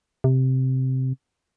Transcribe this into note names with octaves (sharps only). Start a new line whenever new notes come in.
C3